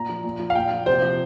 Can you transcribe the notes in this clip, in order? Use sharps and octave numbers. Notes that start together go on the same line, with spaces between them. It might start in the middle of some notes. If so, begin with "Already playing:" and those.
Already playing: A#2 A#5
F3
A#2
F3
F5
A#2 G5
F3
C3 C5
F3